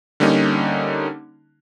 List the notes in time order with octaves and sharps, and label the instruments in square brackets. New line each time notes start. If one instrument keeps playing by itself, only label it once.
[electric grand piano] D3 G3 A#3 C#4 D#4